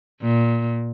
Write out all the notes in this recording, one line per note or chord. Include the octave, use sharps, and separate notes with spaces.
A#2